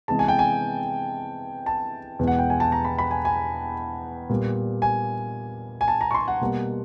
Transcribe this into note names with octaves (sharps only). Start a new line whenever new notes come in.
C3 E3 G#3 B3 A5
G#5
G5
G#5
A5
E2 B2 G#3 B3
F#5
G5
G#5
A5
A#5
B5
B5
G#5
G#5
A#2 G3 B3
G#5
G#5
A5
A#5
C#6
C6
F#5
B2 G3 A#3